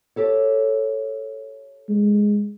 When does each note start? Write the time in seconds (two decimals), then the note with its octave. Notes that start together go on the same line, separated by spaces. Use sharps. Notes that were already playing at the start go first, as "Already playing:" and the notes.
0.16 G4 A4 C#5
1.89 G#3